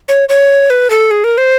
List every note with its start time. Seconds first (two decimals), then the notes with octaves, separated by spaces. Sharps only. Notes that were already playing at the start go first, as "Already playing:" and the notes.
0.09 C#5
0.29 C#5
0.70 B4
0.90 A4
1.11 G#4
1.24 A#4
1.38 C5